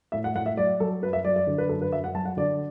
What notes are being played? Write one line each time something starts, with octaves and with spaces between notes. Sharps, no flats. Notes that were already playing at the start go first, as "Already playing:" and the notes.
A2 E5
F#5
A2 F#5
E5
F#3 D5
F#3 A4
F#2 B4
E5
F#3 D5
D5
D3
B4
F#2 A4
B4
F#2 E5
F#5
F#3 A5
F#5
D3 D5